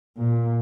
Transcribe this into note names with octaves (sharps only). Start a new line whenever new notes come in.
A#2